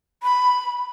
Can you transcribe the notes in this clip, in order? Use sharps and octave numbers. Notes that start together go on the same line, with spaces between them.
B5